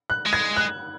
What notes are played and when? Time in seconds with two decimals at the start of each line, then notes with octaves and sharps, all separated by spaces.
0.10 F#6
0.26 G#3
0.33 G#6
0.56 F#6